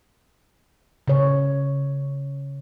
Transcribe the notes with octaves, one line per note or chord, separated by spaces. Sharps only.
C#3 C#5